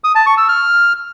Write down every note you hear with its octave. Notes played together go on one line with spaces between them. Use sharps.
D#6
A5
C#6
E6
F6